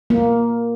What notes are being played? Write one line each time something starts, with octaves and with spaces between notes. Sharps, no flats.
A#3